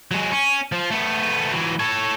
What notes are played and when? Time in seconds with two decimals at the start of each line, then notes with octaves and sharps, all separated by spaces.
0.11 F#3 G#3
0.32 C#4
0.72 F3
0.91 A3 B3
1.52 E3 F#3
1.80 A4 C#5